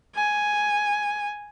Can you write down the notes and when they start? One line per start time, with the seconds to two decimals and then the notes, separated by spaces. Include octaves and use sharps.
0.15 G#5